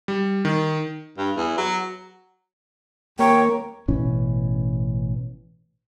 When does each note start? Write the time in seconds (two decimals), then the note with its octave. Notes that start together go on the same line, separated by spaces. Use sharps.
0.08 G3
0.45 D#3
1.18 G2
1.37 E2
1.58 F#3
3.19 D#2 A#3 C#5 G5
3.88 A1 B2 E3 C#4